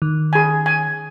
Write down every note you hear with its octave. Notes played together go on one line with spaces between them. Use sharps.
D#3
G#4 G#5
G#5